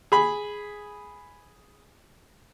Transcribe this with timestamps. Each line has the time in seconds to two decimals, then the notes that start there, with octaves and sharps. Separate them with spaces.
0.12 G#4 B5